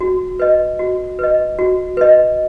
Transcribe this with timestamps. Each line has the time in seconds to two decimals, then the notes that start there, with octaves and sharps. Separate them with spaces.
0.01 F#4
0.39 B4 D#5
0.79 F#4
1.19 B4 D#5
1.59 F#4
1.97 B4 D#5